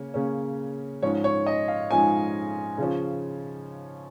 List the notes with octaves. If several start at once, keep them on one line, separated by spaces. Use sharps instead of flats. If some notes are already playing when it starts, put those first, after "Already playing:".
Already playing: C#3 A#3 C#4
C#3 A#3 C#4
G#2 F3 C#4 C#5
C#5
D#5
F5
G#2 F3 C#4 G#5
C#3 F3 C#4